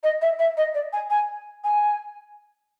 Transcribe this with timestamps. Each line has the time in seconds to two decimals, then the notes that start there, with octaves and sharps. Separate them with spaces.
0.03 D#5
0.21 E5
0.39 E5
0.57 D#5
0.74 D5
0.92 G#5
1.10 G#5
1.64 G#5